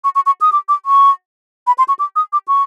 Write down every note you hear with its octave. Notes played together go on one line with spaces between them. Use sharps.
C#6
C#6
C#6
D#6
D6
D6
C#6
B5
C6
C#6
D6
D#6
D6
C#6